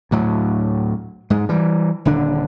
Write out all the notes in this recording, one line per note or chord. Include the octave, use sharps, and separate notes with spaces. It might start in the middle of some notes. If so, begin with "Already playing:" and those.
D2 A2 F#3
G#2 G#3
E3 G3
D#1 D3 D4